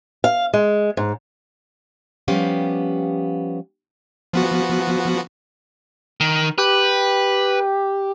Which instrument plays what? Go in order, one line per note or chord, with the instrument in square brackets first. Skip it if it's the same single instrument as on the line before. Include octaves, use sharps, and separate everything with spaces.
[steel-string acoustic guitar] F5
G#3
G#2
F3 G3 B3 C#4 G4 F5
[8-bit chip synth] F3 B3 F#4
[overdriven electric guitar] D#3
[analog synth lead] G4 [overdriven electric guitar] B4